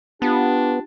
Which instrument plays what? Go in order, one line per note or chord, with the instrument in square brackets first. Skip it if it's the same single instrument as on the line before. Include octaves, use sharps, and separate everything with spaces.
[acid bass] B3 [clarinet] D4 [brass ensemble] F4 G4